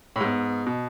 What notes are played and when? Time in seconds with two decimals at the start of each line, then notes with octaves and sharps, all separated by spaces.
0.16 A2
0.21 G#2 B3
0.67 B2